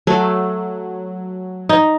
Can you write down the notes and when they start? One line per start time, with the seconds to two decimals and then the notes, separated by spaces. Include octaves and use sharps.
0.07 F#3 A3
1.69 D#4